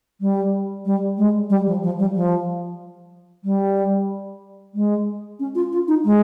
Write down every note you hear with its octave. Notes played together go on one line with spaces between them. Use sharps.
G3
G3
G#3
G3
F3
F3
G3
F3
G3
G#3
C#4
F4
F4
D#4
G#3